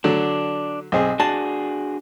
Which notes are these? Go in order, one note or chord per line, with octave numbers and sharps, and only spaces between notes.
D3 F#3 D4
B1 C4 G#4
D4 F#4 G#4 A5